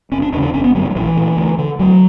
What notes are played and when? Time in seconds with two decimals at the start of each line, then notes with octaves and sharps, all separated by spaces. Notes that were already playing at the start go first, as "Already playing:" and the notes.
0.12 F#1 C#4
0.22 D4
0.32 E2 C#4
0.37 C#3
0.42 D4
0.53 F#1 C#4
0.64 B3
0.74 F#2 D3 F#3
0.85 E3
0.90 F#3
0.95 A#1 E3
1.17 A#2
1.37 D2
1.58 D3
1.79 D2 F#3